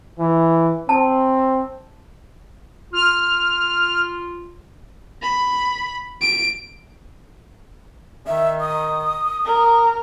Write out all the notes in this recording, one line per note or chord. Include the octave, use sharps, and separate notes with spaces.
E3
C4 A5
F4 F6
B5
D7
D#3 E5
D#6
A#4